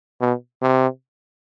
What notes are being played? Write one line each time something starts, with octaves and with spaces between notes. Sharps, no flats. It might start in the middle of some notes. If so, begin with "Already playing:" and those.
B2
C3